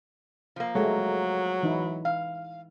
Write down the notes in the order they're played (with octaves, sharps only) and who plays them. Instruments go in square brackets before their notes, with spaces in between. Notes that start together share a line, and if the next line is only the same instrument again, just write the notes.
[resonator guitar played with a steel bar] F3 A#3
[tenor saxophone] F#3 [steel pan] G#3 A3
[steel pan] E3 D#4 E4
[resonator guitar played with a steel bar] F5